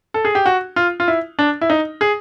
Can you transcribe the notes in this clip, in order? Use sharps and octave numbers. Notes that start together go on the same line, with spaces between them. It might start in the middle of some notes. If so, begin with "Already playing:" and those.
A4
G#4
G4
F#4
F4
F4
E4
D4
E4
D#4
G#4